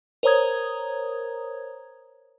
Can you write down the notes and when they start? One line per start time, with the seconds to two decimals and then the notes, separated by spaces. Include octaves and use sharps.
0.23 A#4 C5 C#5 A#5 D#6 G#6